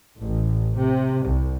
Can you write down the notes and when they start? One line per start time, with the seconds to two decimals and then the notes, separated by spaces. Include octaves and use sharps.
0.18 A1
0.76 C3
1.26 C2